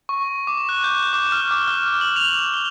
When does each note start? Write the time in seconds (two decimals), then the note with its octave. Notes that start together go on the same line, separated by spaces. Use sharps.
0.09 C#6
0.47 D6
0.69 F#6
0.84 G6
1.13 D6
1.32 F6
1.51 D6
1.68 F6
2.01 F#7
2.16 F7
2.54 G7